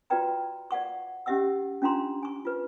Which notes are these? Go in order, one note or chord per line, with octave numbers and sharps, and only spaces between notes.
F4 F#4 B4 D5 G5 A#5
D5 F5 F#5 C#6
C#4 G4 D#5 E5 F#5 E6
C#4 D4 F4 A#5 C6
G#5 C#6
F4 B4